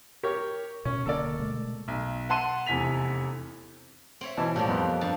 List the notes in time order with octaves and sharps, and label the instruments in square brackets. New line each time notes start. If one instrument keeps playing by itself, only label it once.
[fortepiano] G4 A#4 C#5
[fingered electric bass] B2 [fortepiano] C#4
[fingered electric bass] D1 D3 A#3 [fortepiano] A4 A#4 D5
[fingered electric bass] B2 G#3 A3
[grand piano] B1
F#5 A5 C6 D#7
F1 E2 G#5 B6 F7
[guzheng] C4 C#5 E5
[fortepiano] B2 E3 A5
[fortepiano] A2 [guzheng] F3 G3 A#3
[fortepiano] F2 B3
[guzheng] G2 A5